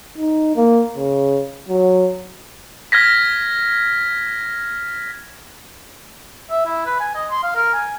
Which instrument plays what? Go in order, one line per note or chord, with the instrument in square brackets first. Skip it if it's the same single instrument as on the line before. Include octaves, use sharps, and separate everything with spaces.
[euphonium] D#4
A#3
C#3
F#3
[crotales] F6 G#6 A#6 B6
[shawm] E5
E4
B4
G#5
D#5
C6
F5
A#4
G#5